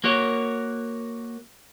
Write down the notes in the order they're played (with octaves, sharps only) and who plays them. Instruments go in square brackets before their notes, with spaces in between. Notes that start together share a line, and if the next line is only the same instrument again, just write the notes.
[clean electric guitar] A#3 F#4 A#4 C#5